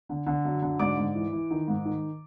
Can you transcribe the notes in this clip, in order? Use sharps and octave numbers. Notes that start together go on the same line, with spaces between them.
D3
D3
F#2
D3
G#2 D5 D6
G#2
E3
E3
D#3
G#2
D#3